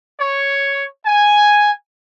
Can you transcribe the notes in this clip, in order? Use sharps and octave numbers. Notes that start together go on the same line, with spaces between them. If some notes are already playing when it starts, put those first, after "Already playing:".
C#5
G#5